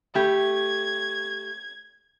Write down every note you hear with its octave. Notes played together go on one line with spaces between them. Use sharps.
A3 G4 G#6